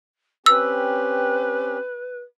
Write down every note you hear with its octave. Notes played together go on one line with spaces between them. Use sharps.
C4 C#4 G4 B4 E6